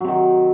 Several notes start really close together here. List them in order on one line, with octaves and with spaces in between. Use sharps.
F#3 C3 D#3